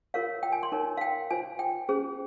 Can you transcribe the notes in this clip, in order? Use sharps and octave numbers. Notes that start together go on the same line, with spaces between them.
F4 A#4 C#5 F5
G5
G#5
C6
D#4 A#4 C#5
F5
G5
F4 C5 G#5
G5
C#4 G#4 C5